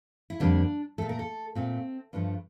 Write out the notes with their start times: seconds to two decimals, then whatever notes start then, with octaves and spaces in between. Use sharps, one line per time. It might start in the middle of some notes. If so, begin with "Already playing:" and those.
0.30 E4
0.40 F2 D3 G3 A#3 D4
0.98 A#2 A3 A4
1.09 A#4
1.19 A4
1.55 A#2 A3 C4
2.13 G2 F3 A3 D4